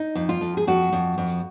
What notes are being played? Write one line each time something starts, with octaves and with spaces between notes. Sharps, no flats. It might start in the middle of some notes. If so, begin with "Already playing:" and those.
Already playing: D#4
F2
F4
F2
G#4
F2 F#4
F2
F2